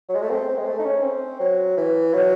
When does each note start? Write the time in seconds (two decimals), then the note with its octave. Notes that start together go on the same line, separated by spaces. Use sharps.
0.09 F#3
0.15 G#3
0.23 A3
0.31 C4
0.49 C4
0.58 G#3
0.66 A3
0.79 D#4
0.85 C#4
1.03 C4
1.40 F#3
1.77 E3
2.13 F#3